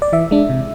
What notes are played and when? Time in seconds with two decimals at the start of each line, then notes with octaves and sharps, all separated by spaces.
0.02 D5
0.13 E3 E5
0.31 G#3 D4
0.49 C3